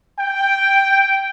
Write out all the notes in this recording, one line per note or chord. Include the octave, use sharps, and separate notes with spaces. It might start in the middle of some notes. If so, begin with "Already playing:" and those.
G5